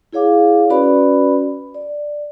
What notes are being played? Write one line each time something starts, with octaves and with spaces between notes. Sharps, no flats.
E4 G#4 C#5 F5 D6
C#4 F#4 B4 D5 B5
D5